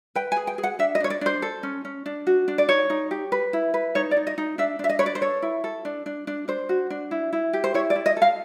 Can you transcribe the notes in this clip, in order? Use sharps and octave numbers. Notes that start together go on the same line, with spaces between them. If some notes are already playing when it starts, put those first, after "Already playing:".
B4 G5
G#5
G#4
G5
G#4
F#5
D4 E5
D#5
D4 C#5
D5
D4 C5
A4
C#4
C#4
D4
F#4
D4
D5
D#4 C#5
D#4
G4
B4
E4
B4
D#4 C#5
D5
D#4
D#5
D#4
D4 E5
D4 E5
D#5
B4 C#5
D5
C5
A4 C#5
E4
A4
D4
D4
D4
D4 C5
F#4
D4
E4
E4
G4
C5
E4 C#5
D5
E4
D#5
A4 F5